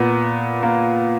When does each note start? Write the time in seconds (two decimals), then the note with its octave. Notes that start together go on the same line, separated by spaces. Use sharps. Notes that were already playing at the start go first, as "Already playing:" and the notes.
Already playing: A#2 B3
0.63 A#3